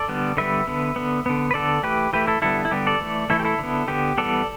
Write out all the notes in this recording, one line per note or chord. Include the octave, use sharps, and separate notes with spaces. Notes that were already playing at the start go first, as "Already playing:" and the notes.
Already playing: A4 D5
D3 G3 B3
D3 G3 B3 B4 E5
D3 B3
D3 B3
D3 B3
B4
D3 B3 A4 D5
E3 A3 G4 B4
E3 A3 G4 B4
E4 A4
D3 G3 B3 E4 A4
E4
D3 G3 B3 G4
A4 D5
E3 A3
E3 A3 E4 A4
G4
E4 A4
D3 B3
D3 B3 G4
E3 G3 B3 A4 D5